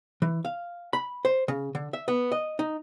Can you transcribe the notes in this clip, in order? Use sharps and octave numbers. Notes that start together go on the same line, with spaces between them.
E3
F5
B5
C5
C#3
D3
E5
B3
D#5
D#4